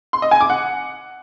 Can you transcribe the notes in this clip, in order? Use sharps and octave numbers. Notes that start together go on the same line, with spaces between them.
C6
D#5
G#5
D6
F#5